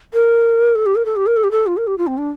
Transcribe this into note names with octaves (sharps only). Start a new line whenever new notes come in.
A#4
A4
G4
A#4
A4
G4
A#4
A4
G4
A4
F4
A#4
G4
F4
C4
D4